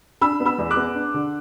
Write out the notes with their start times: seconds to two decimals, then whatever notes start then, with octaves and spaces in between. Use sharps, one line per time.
0.21 D4 B5 E6
0.40 B3
0.46 B5 E6
0.58 E2
0.71 D6 F#6
0.76 B3
0.95 D4
1.14 D3